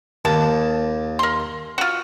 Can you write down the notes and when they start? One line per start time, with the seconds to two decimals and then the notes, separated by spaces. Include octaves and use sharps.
0.25 D#2 A5
1.19 A#4 C6
1.78 F4 F#4